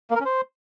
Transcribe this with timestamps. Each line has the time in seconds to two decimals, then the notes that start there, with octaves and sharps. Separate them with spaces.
0.10 A#3
0.15 A#4
0.20 C#4
0.25 C5